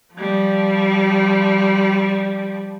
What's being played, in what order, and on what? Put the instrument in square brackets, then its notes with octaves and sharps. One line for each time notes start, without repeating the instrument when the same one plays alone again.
[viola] F3 G3